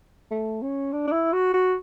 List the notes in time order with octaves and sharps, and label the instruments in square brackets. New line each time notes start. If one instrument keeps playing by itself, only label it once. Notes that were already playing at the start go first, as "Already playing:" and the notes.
[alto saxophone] A3
C#4
D4
D4
E4
F#4
F#4